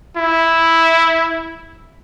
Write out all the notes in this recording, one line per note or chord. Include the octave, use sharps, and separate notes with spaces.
E4